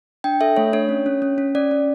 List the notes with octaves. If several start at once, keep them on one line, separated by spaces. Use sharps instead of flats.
D4 G5
A4 E5
A3 C#5
D4 C#5
C#4
C#4
C#4
C#4
C#4 D5
C#4